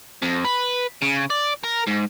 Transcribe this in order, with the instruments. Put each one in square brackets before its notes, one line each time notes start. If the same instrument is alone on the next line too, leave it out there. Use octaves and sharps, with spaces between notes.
[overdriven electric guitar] F2
B4
C#3
D5
A#4
G#2